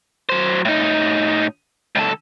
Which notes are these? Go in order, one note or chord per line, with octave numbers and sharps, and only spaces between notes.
F#3 C5
A2 D#4
C#2 A4